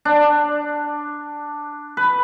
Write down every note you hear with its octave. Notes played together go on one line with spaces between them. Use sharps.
D4
B4